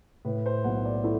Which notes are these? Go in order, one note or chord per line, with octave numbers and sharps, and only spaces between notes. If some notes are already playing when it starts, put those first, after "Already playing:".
A2 B4
C5
B1 F#5
D5
A3 E4